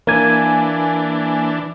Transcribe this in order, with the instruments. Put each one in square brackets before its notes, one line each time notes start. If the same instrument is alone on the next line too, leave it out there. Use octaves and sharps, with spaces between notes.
[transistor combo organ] E3 D4 [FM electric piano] A#3 G#5